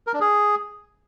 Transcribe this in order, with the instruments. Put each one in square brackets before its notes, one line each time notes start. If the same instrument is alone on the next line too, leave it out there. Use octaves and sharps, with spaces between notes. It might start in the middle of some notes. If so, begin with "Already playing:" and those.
[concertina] A#4
D4
G#4